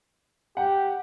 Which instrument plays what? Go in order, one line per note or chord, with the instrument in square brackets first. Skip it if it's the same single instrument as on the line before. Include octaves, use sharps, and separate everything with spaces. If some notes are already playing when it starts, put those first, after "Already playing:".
[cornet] G4 [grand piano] F#5 G5